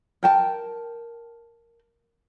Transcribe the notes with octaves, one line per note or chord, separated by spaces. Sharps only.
A#4 G5 A5